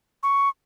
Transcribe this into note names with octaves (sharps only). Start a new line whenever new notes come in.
C#6